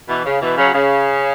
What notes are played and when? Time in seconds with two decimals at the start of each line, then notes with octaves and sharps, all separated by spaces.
0.09 B2 E3
0.26 C#3
0.42 B2 E3
0.57 C#3 F#3
0.74 C#3